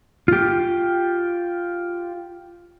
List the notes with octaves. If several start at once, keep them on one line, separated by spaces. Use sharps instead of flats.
F4 G4